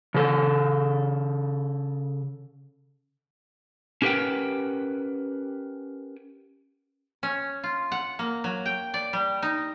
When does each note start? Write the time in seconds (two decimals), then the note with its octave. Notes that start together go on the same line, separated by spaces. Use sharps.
0.14 C#3 A4
4.02 C#4 G4 A#4 B4 F#5 G5
7.23 C#4
7.63 F4
7.92 F#5
8.19 A#3
8.44 F#3
8.66 G5
8.94 D5
9.13 G3
9.42 D#4